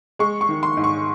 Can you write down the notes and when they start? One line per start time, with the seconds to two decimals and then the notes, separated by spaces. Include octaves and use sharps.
0.19 G#3 C#6
0.41 C#6
0.49 D#3
0.63 C6
0.77 G#2
0.84 C#6